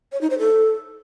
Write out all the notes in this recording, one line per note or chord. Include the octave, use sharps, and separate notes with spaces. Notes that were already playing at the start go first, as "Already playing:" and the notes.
C#5
D#4
C5
A4